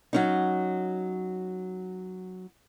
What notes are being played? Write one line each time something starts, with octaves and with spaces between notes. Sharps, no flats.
F#3 C#4 D#4